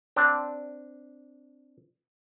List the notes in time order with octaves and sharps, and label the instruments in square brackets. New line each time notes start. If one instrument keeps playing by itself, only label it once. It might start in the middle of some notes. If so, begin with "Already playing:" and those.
[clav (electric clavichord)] C4 D4